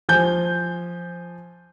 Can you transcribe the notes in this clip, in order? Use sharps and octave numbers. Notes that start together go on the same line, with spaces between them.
F3 G#5 G6